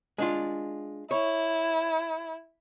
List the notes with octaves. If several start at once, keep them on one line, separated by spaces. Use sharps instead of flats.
G#3 D4 F4
E4 C#5